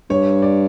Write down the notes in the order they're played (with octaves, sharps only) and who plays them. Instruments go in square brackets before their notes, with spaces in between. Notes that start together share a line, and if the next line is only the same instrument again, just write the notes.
[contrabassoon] G2 [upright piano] C#5
[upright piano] D5